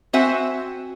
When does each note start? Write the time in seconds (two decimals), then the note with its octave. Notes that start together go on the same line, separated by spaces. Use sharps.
0.13 C4 F#4 C5 E5 F#5 G#5